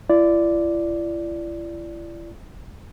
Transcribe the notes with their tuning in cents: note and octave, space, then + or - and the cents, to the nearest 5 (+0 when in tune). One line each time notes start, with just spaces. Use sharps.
E4 +45 D5 -5